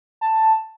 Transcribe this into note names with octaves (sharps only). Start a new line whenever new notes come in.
A5